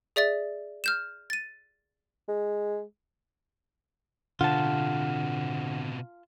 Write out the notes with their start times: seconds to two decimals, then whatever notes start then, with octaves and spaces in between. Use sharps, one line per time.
0.16 G#4 D5 E5 A6
0.84 F6 G6 E7
1.30 A6 D#7
2.29 G#3
4.41 B2 D3 C4 F4 F#5 A5